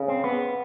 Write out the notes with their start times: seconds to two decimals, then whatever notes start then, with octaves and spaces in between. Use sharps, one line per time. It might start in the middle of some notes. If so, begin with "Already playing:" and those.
Already playing: C#3
0.08 C4
0.24 B3